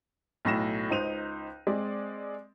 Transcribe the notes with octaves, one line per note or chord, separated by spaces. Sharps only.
B1 A2 A#6 E7
C#2 D#4 C5 D#7 F7
G#3 C4 D5